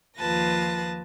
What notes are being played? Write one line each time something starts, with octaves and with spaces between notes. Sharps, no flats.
D#2 F3 F4 B4 A5 A#6